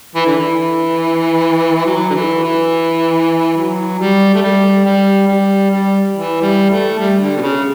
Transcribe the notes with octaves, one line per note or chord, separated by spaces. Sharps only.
E3
D3
E3
F#3
D3
E3
E3
F#3
G3
A3
G3
G3
G3
G3
E3
G3
A3
G3
D3
B2
C#3